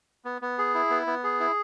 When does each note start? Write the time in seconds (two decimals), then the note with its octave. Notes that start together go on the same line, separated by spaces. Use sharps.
0.25 B3
0.42 B3
0.58 G#4
0.75 E4
0.90 B3
1.07 B3
1.24 G#4
1.40 E4